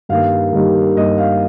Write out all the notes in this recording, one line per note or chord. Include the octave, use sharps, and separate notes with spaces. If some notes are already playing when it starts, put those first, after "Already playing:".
G2 D#3 G3 A#3 F5
G2 D#3 G3 A#3
G2 D#3 G3 A#3 D#5
F5